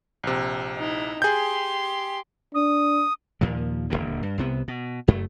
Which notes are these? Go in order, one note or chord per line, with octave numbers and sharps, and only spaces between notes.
A#1 C3
D#4 E4
G4 G#4 C6 G6
D4 D#6
D#2 A#2 F3
D#1 F2 D3 A#3
G2
C2 C3 B3
B2
F#1 F#2 A3